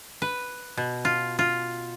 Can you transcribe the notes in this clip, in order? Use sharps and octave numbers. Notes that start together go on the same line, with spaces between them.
B4
B2
F4
F4